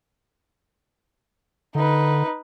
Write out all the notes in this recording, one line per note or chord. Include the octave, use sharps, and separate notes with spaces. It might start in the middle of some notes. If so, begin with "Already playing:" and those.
D3 D#4 B4